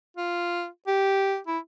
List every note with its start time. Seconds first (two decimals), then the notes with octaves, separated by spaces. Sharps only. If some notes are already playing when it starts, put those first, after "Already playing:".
0.17 F4
0.87 G4
1.47 E4